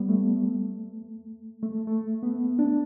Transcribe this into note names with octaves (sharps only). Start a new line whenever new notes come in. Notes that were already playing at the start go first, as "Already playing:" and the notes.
Already playing: G3 B3
A3
A3
A3
B3
D4